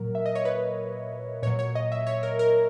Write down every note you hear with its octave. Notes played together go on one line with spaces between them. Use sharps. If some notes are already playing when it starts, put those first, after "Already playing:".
Already playing: A#2 F#3 A#4
E5
D#5
C#5
B4
A#2 F#3 C#5
C#5
D#5
E5
C#5
A#4
A#4